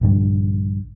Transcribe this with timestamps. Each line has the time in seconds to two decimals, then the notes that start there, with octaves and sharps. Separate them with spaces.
0.01 A#1 G2 D3 G3